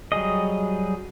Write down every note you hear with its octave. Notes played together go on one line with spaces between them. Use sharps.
F#3 G3 G#4 D#5